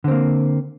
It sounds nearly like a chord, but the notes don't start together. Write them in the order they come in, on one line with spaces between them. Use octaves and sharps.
D3 C4 A#3